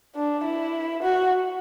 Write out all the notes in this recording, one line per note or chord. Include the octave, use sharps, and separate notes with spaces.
D4
E4
F#4